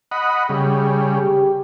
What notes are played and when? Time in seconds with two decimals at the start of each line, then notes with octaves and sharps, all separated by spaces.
0.11 D#5 F#5 B5
0.49 C#3 G3 G#4
1.18 G4